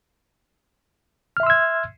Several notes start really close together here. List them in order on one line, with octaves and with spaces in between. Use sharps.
F6 E5 C6 E6 G#6